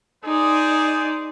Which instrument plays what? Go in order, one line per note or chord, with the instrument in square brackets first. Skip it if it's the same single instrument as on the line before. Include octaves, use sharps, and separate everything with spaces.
[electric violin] D#4 D5 [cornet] G#4 [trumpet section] C5 D#6